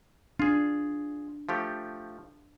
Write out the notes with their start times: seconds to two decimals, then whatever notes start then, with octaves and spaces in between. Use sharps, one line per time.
0.40 D4 F4 G#4
1.49 F3 A3 G4